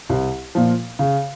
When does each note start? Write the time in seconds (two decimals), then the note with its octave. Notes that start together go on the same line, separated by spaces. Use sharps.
0.09 C2
0.55 A#2 F3
0.99 C#3